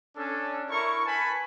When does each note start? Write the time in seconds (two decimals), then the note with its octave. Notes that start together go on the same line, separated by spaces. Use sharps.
0.17 C#4 D4 A4
0.69 E4 A#4 C#6
1.06 B4 G#5 A5 B5